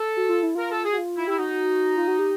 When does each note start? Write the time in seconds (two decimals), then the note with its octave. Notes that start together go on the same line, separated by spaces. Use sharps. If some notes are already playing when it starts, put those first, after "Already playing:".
Already playing: A4
0.17 F#4
0.29 F4
0.43 E4
0.55 F4 A#4
0.70 A4
0.84 G#4
0.92 F#4
0.98 F4
1.17 E4
1.27 E4 G4
1.38 D#4 F#4
1.97 F4
2.08 F#4
2.19 G4